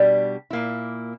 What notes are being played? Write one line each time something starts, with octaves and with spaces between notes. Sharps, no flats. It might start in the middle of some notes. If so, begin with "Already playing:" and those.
Already playing: B2 G3 B3 D4
A#2 A#3 E4